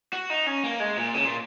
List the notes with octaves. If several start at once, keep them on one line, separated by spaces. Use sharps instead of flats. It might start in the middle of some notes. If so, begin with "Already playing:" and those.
F#4
D#4
C#4
A#3
G#3
A#2
C#3
A#2